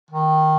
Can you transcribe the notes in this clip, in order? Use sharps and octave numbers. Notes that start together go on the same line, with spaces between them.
D#3